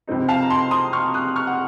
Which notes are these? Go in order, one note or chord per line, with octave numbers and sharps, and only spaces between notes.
C#2 C3 F3 C4 D#4
F5 A5
A#5
A5 C6
C6 D#6
C#6 F6
D#6 F#6
C#6 F6
F#5